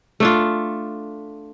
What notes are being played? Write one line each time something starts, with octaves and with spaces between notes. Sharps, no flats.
A3 D4 F4